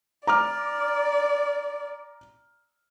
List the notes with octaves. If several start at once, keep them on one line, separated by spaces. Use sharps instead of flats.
D5 A#5 D6 F6